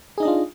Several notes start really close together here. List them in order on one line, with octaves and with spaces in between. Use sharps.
G#4 D#4 D#5 D4 F4